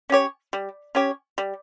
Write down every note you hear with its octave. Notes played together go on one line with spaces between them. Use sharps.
C#4 G4 C#5
G3
C#4 G4 C#5
G3